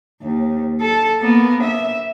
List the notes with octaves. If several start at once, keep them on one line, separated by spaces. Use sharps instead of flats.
D#2
A4
A#3 B3
E5